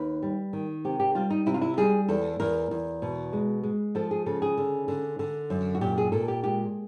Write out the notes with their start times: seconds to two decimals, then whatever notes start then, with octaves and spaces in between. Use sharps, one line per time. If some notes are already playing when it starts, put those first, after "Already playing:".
Already playing: D#2 B4
0.23 G3
0.53 D#3
0.85 C3 G4
1.00 G4
1.15 G3 F4
1.30 D#4
1.46 C3 E4
1.54 F4
1.62 E4
1.77 G3 G#4
2.08 E2 A4
2.40 E2 A#4
2.71 E2
3.02 B2
3.33 G#3
3.63 G#3
3.95 F3 A4
4.11 G#4
4.26 C#3 A4
4.42 G#4
4.57 D3
4.88 D3
5.19 D3
5.50 F#2
5.75 F#4
5.81 A#2 G4
5.98 G#4
6.12 A#2 A4
6.28 G4
6.43 G#3 G4